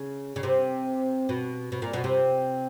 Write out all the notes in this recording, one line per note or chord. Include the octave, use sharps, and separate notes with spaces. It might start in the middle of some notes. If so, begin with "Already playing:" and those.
Already playing: C#3
C#3
C3
B2
B2
A#2
B2
C3